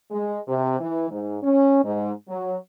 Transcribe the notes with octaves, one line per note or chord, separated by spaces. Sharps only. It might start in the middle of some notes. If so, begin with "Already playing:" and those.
G#3
C3
E3
G#2
C#4
G#2
F#3